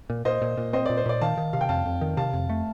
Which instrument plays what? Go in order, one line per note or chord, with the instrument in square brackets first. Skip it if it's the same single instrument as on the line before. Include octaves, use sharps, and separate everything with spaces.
[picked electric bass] A#2
[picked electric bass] A#2 [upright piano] C5 D#5
[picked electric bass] A#2
A#2
[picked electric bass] C4 [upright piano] C5 D#5
[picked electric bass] A#2 [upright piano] D5
[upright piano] C5
[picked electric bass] A#2 [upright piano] D5
[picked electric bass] D#3 [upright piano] F5 A5
[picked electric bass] D#3
[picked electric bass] C3 [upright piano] F5
[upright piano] G5
[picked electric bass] F2 [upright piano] F5 A5
[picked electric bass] F2
D#3
[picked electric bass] C3 [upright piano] F5 A5
[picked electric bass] F2
A3